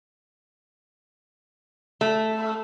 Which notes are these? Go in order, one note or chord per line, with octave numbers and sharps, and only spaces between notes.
A3